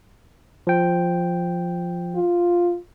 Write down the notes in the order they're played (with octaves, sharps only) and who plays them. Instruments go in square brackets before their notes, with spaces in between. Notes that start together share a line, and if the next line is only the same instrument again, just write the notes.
[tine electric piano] F3 G5
[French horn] F4